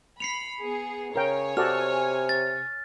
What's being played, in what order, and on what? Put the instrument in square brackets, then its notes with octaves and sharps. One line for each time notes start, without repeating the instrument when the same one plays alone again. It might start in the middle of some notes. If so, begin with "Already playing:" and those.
[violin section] B5 [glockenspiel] C7 C#7 F7
[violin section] B3 G#4
[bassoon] C#3 [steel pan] A#4 G5 [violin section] C#5 G#5
[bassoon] C3 [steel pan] F#4 A4 D5 [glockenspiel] F6
[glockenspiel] A6